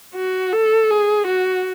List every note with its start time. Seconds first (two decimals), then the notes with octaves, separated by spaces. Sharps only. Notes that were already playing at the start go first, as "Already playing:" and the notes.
0.15 F#4
0.52 A4
0.90 G#4
1.27 F#4